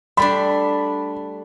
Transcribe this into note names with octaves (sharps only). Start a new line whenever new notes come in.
G3 A3 D4 B5